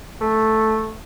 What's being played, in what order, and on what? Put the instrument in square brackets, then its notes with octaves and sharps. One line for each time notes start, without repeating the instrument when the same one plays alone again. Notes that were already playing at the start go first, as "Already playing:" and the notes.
[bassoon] A3